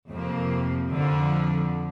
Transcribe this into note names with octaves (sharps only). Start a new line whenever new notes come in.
F2 C3 F3 A#3
F2 D3 F3